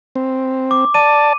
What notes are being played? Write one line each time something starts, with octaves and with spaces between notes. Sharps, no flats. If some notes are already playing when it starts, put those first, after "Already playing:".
C4
D6
D5 A5 D#7